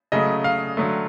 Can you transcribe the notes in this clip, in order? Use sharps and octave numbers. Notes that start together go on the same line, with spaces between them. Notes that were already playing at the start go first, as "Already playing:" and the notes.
C#3 F#3 A3 D#5
F5
D3 F#3 A3